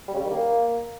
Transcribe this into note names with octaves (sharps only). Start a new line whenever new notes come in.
G3
C#3
G3
D#3
A#3